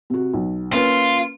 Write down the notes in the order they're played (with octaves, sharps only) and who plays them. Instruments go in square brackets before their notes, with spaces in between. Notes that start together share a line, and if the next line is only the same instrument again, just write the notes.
[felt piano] C3 F#4
B1
[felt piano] A#3 C#4 B4 [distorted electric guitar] F4